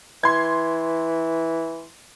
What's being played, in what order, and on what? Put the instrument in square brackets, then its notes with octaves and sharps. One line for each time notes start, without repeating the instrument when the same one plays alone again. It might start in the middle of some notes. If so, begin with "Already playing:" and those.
[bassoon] E3 [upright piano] C6 G#6